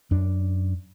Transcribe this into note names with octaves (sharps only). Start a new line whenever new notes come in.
F#2 D4